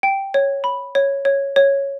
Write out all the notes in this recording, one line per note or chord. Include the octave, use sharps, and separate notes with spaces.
G5
C#5
B5
C#5
C#5
C#5